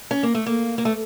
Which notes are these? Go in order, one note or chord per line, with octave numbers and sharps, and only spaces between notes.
C#4
A#3
A3
A#3
A#3
A3